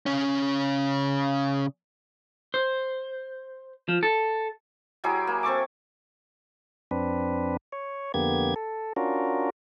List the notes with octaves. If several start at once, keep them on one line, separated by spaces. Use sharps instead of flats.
C#3 C#4
C5
F3
A4
F#3 E4 G4 G#4
A#3
C4 A4 C#6 D6
F2 C4 D4 B4
C#5
F2 D3 A#3 B3 G4 G#6
A4
C#4 D4 F4 F#4 A#4